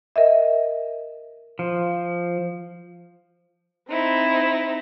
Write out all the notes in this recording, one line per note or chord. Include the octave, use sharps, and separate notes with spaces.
A#4 D#5 E5
F3
C4 D#4 E4